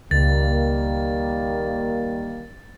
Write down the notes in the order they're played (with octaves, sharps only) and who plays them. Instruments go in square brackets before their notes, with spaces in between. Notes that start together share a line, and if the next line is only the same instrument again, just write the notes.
[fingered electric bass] C#2 [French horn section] D#3 G3 A#3 [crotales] A6